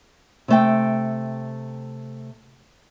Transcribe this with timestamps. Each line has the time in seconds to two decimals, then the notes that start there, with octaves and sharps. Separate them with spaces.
0.48 C3 A3 G5